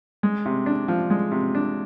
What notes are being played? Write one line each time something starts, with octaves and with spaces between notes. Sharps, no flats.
G#3
C3
D4
F3
G#3
C3
D4